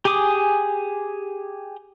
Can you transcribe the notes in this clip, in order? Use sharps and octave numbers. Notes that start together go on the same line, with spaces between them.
G4 G#4 G#5 D6 D#6